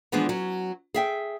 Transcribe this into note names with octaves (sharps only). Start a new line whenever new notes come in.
E3 F3 G#3 B3 D4
F#3 C#4
G#4 E5 G5